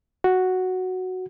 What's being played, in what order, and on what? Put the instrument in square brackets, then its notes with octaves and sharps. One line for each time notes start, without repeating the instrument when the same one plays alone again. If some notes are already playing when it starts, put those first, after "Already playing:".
[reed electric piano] F#4